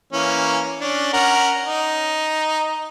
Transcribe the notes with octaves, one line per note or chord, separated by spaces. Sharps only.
E3 A#3 C#4
C#4 D4
C#4 A#4 F#5
D#4